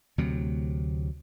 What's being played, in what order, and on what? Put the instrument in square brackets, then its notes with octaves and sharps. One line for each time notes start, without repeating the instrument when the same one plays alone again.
[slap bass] D2 C3 F#3